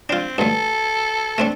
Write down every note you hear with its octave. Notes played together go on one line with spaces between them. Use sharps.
C4 D4 F4
D2 G2 A4
A3 C4 D4